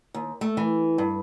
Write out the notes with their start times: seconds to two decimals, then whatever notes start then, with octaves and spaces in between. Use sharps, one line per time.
0.15 D#2
0.41 A3
0.57 E3
0.98 G2